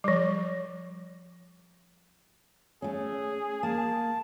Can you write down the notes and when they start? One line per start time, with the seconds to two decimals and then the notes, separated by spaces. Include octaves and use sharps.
0.04 F3 G3
2.82 A3 C#4 G#4
3.63 A#3 A5